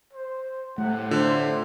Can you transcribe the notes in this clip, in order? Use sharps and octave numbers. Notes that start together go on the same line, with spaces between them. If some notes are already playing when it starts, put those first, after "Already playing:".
C5
A2 C3 A3 F#5
D3 F4 C5